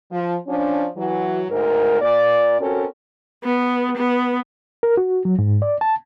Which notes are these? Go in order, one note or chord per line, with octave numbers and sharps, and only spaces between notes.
F3
F3 C#4 D4
E3 F#3
D2 G#2 A#4
A#2 D5
C4 C#4 F#4 A4 A#4
B3
B3
A#4
F#4
F#3
G#2
D5
A5